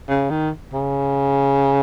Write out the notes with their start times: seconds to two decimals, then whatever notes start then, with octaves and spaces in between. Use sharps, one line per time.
0.09 C#3
0.30 D#3
0.73 C#3